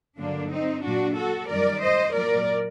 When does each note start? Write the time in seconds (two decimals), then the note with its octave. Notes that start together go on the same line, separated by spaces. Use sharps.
0.19 G2 D3 F#3 A#3 D4
0.51 C4 D#4
0.83 A#2 F#3 D4 F#4
1.16 F#4 A4
1.49 F#2 D#3 G3 A#4 D5
1.81 C5 D#5
2.14 A#2 F#3 A#4 D5